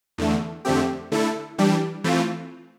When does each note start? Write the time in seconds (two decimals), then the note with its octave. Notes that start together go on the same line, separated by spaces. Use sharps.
0.18 E2 D3 A3
0.65 F2 D3 A3 C4 G4
1.12 D3 A3 E4 A4
1.58 E3 G3 D4 G4
2.04 E3 A3 C4 F4